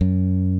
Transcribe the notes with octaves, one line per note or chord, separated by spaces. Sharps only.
F#2